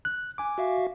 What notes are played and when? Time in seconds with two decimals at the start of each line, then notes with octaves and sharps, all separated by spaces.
0.05 F#6
0.38 G#5 D6
0.58 F#4 E5 F5